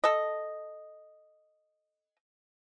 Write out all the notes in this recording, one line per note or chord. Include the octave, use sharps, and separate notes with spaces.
A4 D#5